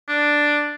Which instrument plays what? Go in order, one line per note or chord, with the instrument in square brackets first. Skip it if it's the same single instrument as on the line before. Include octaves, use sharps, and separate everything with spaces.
[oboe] D4